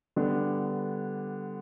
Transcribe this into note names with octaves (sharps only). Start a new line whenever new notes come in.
D3 G3 B3 D4